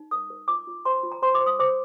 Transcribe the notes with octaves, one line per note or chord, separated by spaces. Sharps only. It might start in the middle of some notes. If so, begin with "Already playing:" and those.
Already playing: D#4
A#4 D#6
A#4
F4 D6
F4
C5 C6
F4
A#5
C5 C6
D6
C5
D#6
C5 D6